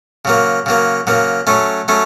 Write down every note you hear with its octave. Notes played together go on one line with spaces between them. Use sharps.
C#3 F#3 A#3
C#3 F#3 A#3
C#3 F#3 A#3
F#3 A3 C#4
F#3 A3 C#4